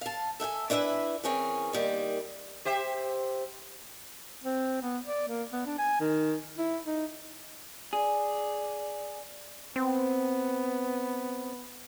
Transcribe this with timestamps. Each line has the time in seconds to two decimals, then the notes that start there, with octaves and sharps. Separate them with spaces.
0.01 F5 A5
0.40 A4 E5 F#5 G#5
0.70 D4 E4 B4 E5 G#5
1.24 E3 C4 C#4 G#4 A#4
1.73 D#3 G3 A#3
2.65 G4 C5 E5
4.43 C4
4.82 B3
5.05 D5
5.28 A#3
5.52 B3
5.66 D4
5.78 G#5
6.00 D#3
6.58 E4
6.85 D#4
7.93 G#4 D5
9.76 B3 C4